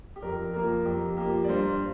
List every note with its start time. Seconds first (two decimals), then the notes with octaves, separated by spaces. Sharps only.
0.16 G4
0.22 F2 A#4
0.53 F3 A#3 A#4
0.85 F2 G4
1.17 F3 A#3 G4
1.44 D5
1.48 G2 C5